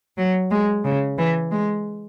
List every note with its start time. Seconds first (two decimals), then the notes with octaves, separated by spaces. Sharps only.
0.17 F#3
0.50 G#3
0.84 C#3
1.18 E3
1.51 G#3